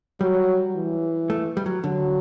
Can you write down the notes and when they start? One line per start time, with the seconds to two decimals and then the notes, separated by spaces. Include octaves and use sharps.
0.21 F#3 G3
0.75 E3
1.30 A3
1.57 G3
1.66 F#3
1.84 D3 F#3